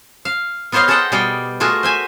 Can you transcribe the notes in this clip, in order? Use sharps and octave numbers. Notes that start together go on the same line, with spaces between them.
F5
B3 F4 C5 C#5 D#5 F5
G#4 A4 C5 D#5 F#5 G5
B2 G3 G#4 D5 F5 G5
A3 F4 F#4 G#4 A#4
C5 E5 G#5